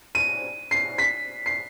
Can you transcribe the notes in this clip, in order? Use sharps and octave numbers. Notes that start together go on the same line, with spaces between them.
D#7
C7
B6
C7